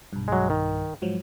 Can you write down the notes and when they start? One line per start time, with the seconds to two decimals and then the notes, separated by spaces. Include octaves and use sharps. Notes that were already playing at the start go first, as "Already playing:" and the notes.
0.13 B1 G2
0.28 F#3 G#3
0.50 D#3
1.02 G#2 F3 F#3